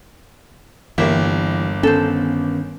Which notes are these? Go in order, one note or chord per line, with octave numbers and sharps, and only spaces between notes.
G1 E3 G3 A#3 E5
D#3 B3 C#4 A4 C5